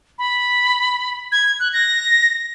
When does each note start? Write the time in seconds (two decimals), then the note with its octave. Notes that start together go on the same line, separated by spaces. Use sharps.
0.19 B5
1.32 G#6
1.60 F#6
1.74 A#6